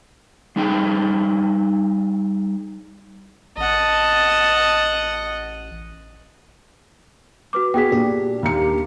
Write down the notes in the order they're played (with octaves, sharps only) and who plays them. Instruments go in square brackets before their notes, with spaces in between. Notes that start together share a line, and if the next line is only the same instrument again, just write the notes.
[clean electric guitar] G3 D4 D#4 G#4 G5
[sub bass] A1 [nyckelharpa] D#5 F#5 [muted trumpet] A5
[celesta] F#4 B4 D6
[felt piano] B3 F#4 G#4 [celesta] G5 B6
[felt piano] A#2 [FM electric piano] D4 G4
[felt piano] D#2 A#3 C#7